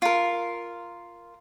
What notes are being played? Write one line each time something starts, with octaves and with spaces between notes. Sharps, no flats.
F4 A#4